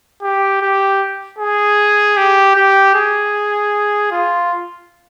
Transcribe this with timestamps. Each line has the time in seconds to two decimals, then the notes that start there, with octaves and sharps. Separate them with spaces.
0.22 G4
0.62 G4
1.38 G#4
2.17 G4
2.56 G4
2.95 G#4
4.12 F4